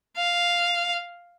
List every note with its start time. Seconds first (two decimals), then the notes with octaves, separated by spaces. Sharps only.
0.16 F5